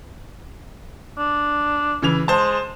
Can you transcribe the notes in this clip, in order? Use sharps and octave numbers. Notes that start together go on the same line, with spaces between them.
D4
C#3 E3 F7
G#3 C5 A5